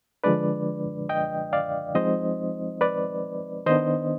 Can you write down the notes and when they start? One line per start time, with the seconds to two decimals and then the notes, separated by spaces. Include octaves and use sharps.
0.24 D3 F3 G#3 D4 B4 D5
1.09 D#5 G5
1.53 D5 F5
1.95 F3 G#3 C4 D#4 C5 D#5
2.81 B4 D5
3.66 D#3 B3 D4 C5 D#5